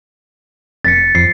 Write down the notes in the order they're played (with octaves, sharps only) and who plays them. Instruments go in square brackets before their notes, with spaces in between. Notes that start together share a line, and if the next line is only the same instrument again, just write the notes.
[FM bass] F1 [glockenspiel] A6 B6 C#7
[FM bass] F2 [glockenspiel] C7